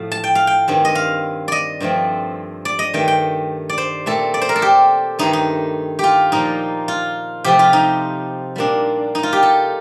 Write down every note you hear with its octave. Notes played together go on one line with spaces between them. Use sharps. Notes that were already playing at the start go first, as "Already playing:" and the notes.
Already playing: A2 F3 A3 F5
A5
G5
F5
G5
G2 D#3 G3 C4
D#5
F5
D5 D#5
G2 F3 A3 C4
D5
D#5
G2 D#3 A3 G5
G5
D5
C5
A#2 A3 C4 A4
D5
C5
A#4
A4
G4
G2 D#3 A3 D#4
D#4
F4 G4
A#2 F3 A#3 D#4
F4
C3 F3 A3 C4 G4
F4
D#4
A#2 G3 A#3 D4
D#4
F4
G4
A4